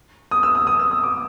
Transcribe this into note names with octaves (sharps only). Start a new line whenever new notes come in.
D#6
E6
D#6
D#6
E6
D#6
D6